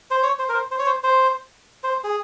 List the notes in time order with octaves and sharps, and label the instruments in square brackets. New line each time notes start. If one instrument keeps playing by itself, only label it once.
[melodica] C5
C#5
C5
A#4
C5
C5
C#5
C5
C5
C5
G#4